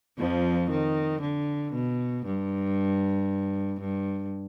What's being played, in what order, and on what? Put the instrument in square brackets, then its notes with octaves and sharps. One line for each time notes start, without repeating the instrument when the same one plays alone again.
[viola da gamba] F2 F3
D#3
D3
B2
G2
G2